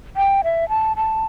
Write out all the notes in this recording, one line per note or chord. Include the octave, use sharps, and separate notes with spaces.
G5
E5
A5
A5